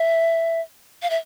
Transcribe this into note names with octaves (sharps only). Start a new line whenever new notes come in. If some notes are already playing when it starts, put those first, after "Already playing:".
Already playing: E5
F5
E5